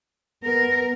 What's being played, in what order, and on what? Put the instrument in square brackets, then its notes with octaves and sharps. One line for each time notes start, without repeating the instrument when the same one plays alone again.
[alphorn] B3 [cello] A#4